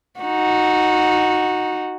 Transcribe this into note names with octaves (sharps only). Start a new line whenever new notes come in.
D#4 F#4